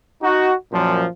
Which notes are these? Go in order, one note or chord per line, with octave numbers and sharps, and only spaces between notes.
D#4 F#4
F#2 A#2 F3